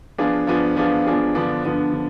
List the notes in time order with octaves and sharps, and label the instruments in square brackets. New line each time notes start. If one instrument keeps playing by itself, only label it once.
[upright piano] F3 B3 D4 F4 G#4
F3 B3 D4 F4 G#4
F3 B3 D4 F4 G#4
F3 B3 D4 F4 G#4
D3 F3 B3 D4
D3 F3 B3 D4
D3